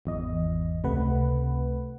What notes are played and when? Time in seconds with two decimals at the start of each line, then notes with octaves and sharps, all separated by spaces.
0.05 G#1 E2 D#5
0.84 C#2 C3 A3 B4 F#5